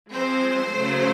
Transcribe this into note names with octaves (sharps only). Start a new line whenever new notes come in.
F3 G#3 C4 C5
C#3 F#3 A3